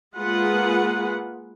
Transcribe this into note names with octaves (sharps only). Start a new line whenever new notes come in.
G#3 A#3 F4 G#4 B4 F#5